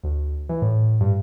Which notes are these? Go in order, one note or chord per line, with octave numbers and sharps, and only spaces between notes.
D2
E3
A2
G2